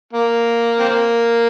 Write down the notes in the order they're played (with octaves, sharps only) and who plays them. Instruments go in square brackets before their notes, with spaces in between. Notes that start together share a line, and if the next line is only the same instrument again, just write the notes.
[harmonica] A#3
C4
A#3